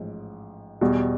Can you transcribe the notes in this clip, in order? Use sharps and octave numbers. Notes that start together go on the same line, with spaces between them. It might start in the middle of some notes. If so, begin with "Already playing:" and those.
Already playing: A1 G#2 F3
E2 B2 G3